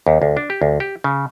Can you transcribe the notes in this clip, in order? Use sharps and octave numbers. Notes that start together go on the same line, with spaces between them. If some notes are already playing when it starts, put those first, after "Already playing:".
D#2
D2
D4
G4
D2
G4
C#3